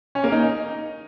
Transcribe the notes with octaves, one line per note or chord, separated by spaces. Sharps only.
C#4
A#3
D#4